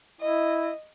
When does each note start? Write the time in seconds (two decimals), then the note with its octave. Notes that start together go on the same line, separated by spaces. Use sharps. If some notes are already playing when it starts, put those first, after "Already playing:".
0.21 E4 D#5